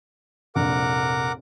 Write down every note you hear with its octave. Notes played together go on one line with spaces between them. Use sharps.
F1 A#1 A#4 F#5 D6